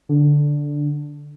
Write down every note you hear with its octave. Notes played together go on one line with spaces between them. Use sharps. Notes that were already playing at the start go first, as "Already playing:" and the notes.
D3